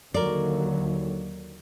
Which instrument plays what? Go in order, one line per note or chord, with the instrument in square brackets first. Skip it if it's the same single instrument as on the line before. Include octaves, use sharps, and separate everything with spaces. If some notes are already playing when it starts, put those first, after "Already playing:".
[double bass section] D#2 D3 F#3 [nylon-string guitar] A#4 D5